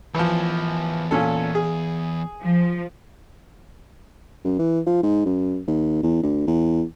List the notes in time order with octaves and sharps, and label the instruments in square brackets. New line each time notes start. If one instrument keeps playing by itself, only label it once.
[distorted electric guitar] E2 C#5 [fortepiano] E3 F3
[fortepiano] A#2 C#4 A4
G#4
[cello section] F3
[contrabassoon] F#2
E3
F3
G#2
F#2
D#2
E2
D2
E2